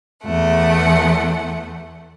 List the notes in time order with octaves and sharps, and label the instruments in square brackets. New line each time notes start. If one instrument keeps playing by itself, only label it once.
[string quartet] E2 A3 F#5